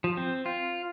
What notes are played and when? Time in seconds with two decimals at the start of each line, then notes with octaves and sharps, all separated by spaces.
0.04 F3
0.17 C4
0.46 F4